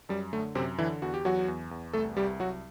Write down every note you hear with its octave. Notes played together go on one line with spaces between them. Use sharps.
F#2 G3
D3 A3
F#2 C3 C4
D3 E3 E4
E2 F#4
G4
E2 F#3 F#4
E2
E2
C2 A3 A4
C2 G3 G4
C2 F#3 F#4